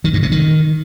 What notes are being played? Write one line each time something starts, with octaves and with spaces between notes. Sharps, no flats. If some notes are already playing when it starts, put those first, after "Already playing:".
D#3
G2
C3
D#3